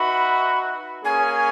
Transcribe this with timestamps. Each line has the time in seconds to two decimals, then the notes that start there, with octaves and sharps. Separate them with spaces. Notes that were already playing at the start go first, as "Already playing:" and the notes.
Already playing: D#4 F#4 B4 E5 B5
1.04 A#3 C#4 G#4 G#5